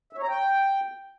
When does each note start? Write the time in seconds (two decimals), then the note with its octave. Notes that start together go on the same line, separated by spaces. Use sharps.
0.13 E5
0.18 C#5
0.23 A#5
0.28 G5